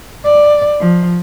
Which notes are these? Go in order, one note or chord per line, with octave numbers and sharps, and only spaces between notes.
D5
F3